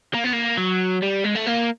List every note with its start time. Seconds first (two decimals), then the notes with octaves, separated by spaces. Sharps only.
0.14 A#3
0.24 B3
0.33 A#3
0.57 F#3
1.02 G3
1.24 G#3
1.35 A3
1.46 A#3